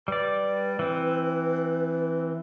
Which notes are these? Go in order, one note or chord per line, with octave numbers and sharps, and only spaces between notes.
G3 B4 D5
E3 C4